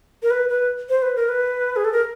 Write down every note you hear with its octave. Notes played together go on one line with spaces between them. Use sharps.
A#4
B4
B4
C5
B4
A#4
B4
G#4
A4
A#4